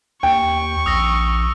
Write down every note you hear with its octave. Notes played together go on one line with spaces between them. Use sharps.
D#2 G5 C#6
A#1 D#6 E6 A#6